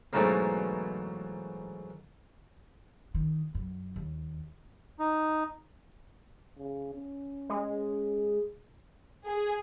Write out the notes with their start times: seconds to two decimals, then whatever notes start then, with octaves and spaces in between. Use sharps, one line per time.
0.13 G#2 B2 E3 F#3 A3 A#3
3.14 D#3
3.55 F#2
3.96 D#2
4.99 D#4
6.58 C#3
6.94 C#4
7.49 G#3
9.25 G#4